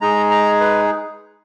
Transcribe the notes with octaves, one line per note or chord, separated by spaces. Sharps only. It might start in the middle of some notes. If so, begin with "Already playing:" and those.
G#3 D#4 G#4 A#5
A#5
B4